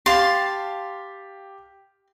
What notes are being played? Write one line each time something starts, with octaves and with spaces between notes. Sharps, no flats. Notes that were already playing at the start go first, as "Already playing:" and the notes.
G4 F5 A5 C6